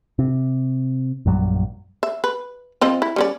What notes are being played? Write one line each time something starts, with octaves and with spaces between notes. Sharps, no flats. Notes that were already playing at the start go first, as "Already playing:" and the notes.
C3
A#1 F#2 F#3 G3
E5
B4
F3 C4 D#5
E4
G3 C#4 D5